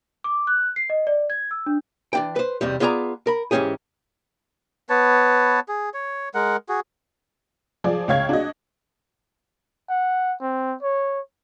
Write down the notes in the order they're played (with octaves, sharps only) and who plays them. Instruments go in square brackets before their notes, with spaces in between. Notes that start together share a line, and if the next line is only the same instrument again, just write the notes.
[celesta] D6
F#6
C7
D#5
D5
G#6
E6
D4
[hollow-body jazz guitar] E3 D4 G5
B4 C5
B1 E2 C3 G3
B3 F4 G#4 D5 G#5 A#5
A#4 B5
G#2 E3 G3 C#4 G4 G#4
[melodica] B3 B4 C#5 A5
G#4
C#5
G#3 A#4 F#5
F#4 G#4
[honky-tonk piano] F3 G#4 D5
C#2 C#5 F5 G#6
D4 F#4 D#5
[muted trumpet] F#5
C4
C#5